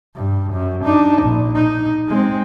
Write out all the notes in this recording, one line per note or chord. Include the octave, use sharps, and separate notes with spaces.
G2
F#2
D4 D#4
A#1
D#4
G#3 C4